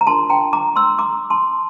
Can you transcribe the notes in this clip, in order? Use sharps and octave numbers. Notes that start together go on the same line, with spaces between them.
A#5
D4 F4 A#4 A5 C6
G5 A#5
A#5 D6
C6 E6
A#5 D6
A5 C6